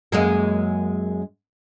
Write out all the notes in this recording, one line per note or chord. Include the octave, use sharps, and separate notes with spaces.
F#2 G#3 A#3